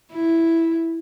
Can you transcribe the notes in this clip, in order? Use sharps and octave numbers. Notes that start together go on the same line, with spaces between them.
E4